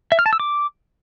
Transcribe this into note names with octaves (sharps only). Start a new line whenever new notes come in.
E5
F6
A5
E6
D6